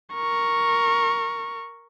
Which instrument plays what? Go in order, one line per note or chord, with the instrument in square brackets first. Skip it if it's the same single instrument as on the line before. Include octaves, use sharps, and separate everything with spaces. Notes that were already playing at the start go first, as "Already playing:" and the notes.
[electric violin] A#4 C#6